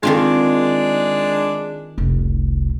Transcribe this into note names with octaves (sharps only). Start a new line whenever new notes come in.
D#3 G#3 C4 D4 F4
F1 C2